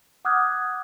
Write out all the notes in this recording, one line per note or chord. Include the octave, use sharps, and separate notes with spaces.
F#5 D6 D#6 F6 F#6 G#6